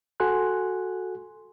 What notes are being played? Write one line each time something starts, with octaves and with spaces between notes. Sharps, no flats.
F#4 A4 G#5 C6 F#6